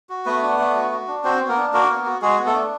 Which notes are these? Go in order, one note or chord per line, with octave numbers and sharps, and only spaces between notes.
F#4
A3 B3 B4
D4
A3
F#4
F#4
D4
C4 F#4 C5
B3
A#3 A#4
D4
A#3 F#4 A#4
B3
F#4
G#3 F#4 G#4
B3
A3 A4
D4